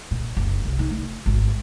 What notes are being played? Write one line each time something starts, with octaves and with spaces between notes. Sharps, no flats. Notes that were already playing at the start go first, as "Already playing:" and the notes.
A#2
F#1
C2
D#4
A3
G#1